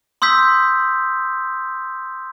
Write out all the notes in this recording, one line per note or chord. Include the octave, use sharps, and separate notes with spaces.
C6 D#6 E6 G6 B6